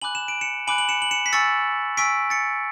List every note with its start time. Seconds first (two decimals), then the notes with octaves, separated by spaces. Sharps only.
0.02 G#5 B5 D6 F#6 F#7
0.15 E7
0.28 D7
0.41 C#7 E7
0.67 G#5 B5 D6 F#6 D7 F#7
0.78 F#7
0.89 C#7 E7
1.02 F#7
1.11 C#7 E7
1.26 B6
1.33 G#5 C#6 E6 A6 C#7
1.97 G#5 C#6 E6 B6 D7
2.30 A6 C#7